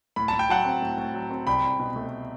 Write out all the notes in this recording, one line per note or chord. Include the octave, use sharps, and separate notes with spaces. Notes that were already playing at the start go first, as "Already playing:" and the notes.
A2 B5
A2 A5
G5
F#3 F#5 A5
C4
A2
A2
F#3
C4
C2 G5 B5
C2
B2
A3